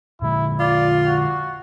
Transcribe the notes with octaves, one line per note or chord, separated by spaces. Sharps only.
A#2 D3 G#3 E4
F4 D5
F#4